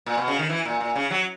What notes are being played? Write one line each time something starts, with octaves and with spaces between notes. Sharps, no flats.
A#2
B2
C#3
D#3
E3
A#2
A#2
C#3
F#3